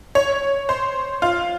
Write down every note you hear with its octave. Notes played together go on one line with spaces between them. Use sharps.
C#5
C5
F4